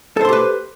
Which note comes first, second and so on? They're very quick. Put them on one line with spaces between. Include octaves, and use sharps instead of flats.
A4 C5 C6 G4 B4